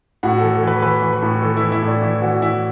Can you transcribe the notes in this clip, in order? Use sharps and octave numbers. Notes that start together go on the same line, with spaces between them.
A2 F#4
E3 A4
A4
E3 B4
E3 B4
E3
B4
A2
E3 A4
E4
E3
E4
A2 D4
E3 E4
E3 F#4
E3 E4